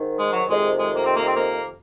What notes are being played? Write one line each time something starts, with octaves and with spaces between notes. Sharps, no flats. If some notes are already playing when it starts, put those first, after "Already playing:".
Already playing: G#2 D#3
G#3
F#3
F2 C3 D#3 G#3
G#3
A#3
C4
A#3
C4
A#3